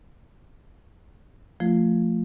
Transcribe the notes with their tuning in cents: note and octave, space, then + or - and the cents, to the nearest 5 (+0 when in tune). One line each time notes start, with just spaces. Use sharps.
F3 +0 A3 +20 F4 -10